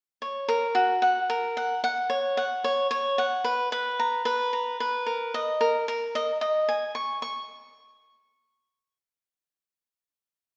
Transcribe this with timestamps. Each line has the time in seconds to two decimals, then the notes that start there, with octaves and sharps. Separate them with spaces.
0.22 C#5
0.48 A#4
0.75 F#4
1.02 F#5
1.30 A#4
1.57 F#5
1.84 F#5
2.10 C#5
2.37 F#5
2.64 C#5
2.91 C#5
3.18 F#5
3.44 B4
3.72 B4
3.99 A#5
4.25 B4
4.53 A#5
4.80 B4
5.06 A#4
5.34 D#5
5.61 A#4
5.88 A#4
6.15 D#5
6.41 D#5
6.69 G#5
6.95 C#6
7.22 C#6